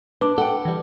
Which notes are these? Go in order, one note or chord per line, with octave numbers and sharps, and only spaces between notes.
D4 B4 D6
A4 F#5 G5
E3 G3